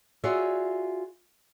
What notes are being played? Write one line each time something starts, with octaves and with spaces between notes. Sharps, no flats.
F4 F#4 G#4 C#5 D5 E5